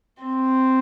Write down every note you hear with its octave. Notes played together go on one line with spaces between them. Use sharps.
C4